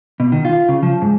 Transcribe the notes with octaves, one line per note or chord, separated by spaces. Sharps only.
B2
D#3
F4
C#3
F3
G#2